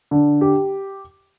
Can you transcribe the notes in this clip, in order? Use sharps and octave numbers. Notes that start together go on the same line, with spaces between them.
D3
G4